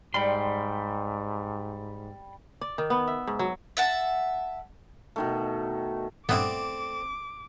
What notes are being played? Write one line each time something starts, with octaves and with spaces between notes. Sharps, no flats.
G#2 G3 G5 B5 C6
D5
D#3
B3
E5
G#2
F#3
E5 F#5 A5
B2 D#3 A3
G2 A#2 A3 B3 C4 E4 D5 D6